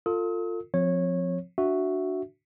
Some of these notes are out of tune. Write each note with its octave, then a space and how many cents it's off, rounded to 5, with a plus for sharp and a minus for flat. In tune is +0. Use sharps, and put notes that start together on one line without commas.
F4 +10 A4 +40 D#6 +40
F3 +20 C4 -5 C#5 -15
D4 +0 F#4 +0 E5 +0